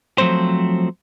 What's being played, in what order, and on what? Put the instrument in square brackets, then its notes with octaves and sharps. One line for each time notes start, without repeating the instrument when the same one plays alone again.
[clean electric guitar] F3 F#3 A3 C4 C5